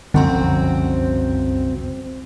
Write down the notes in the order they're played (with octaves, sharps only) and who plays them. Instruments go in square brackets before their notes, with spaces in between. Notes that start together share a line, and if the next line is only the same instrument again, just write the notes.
[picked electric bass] F#1 C2 C#4 [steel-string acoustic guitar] F2 C4 F#4 [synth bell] D3 A#5